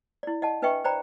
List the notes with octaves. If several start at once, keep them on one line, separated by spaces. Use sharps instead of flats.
E4 D5
D#5 F#5 A5
D4 B4 D#5 E5 G5 C#6
C5 D5 G5 A#5 B5